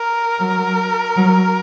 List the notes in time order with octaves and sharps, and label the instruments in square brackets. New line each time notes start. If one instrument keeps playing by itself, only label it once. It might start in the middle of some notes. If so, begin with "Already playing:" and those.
Already playing: [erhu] A#4
[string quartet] F#3
F#3